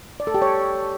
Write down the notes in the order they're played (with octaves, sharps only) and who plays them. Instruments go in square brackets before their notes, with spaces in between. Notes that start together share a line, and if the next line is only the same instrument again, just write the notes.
[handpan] D5
A4
G4
C#5